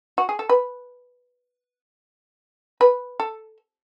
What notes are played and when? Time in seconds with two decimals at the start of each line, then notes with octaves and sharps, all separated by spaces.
0.18 F#4
0.29 G#4
0.39 A4
0.49 B4
2.81 B4
3.20 A4